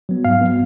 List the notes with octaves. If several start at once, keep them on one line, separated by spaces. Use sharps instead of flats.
F#3 B3
G#2 F5
F#3 B3